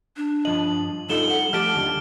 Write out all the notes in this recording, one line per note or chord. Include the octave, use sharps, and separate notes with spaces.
D4
G2 F3 D#5 F#7
G3 D#4 F4 A4 E7 G7
F#5
F3 A3 G4 A4 F6 D7 G7
D#2 D3 G3